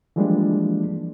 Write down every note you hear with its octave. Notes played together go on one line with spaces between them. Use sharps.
E3 F3 G3 G#3 A#3 D4